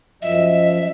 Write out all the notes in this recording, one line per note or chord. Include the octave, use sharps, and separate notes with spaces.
F#2 F3 D#5 E5